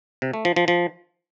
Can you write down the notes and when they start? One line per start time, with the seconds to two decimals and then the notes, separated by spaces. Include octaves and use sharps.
0.22 C3
0.33 A3
0.45 F3
0.56 F3
0.68 F3